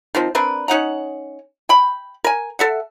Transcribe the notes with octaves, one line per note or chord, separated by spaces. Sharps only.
D#3 F3 C4
C4 D4 A#4 B4
C#4 D#4 F#5 A#5
G5 B5
A#4 G#5
A4 E5 F#5